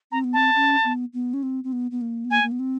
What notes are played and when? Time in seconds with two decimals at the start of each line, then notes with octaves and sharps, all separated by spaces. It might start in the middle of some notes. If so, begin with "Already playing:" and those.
0.12 C4 A#5
0.24 B3
0.33 C4 A5
0.56 C#4
0.84 B3
1.14 B3
1.34 C#4
1.43 C4
1.64 C4
1.73 B3
1.91 B3
2.01 A#3
2.25 B3
2.30 A#3 G#5
2.43 A#3
2.52 B3
2.59 C4